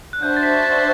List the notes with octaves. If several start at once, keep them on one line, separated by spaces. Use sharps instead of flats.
F#6
D4 F#4 C5 E5 A5 G6
A6
B6
A6